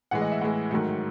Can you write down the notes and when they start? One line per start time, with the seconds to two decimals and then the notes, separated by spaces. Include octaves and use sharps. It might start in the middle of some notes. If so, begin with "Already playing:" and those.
0.11 A2 E3 G#3 F#5
0.22 D#5
0.32 E5
0.41 A2 E3 G#3 F#5
0.71 G#2 D#3 F#3 A3